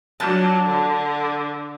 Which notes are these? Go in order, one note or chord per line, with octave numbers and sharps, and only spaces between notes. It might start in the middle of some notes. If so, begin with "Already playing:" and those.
F#3 D4 A5
D3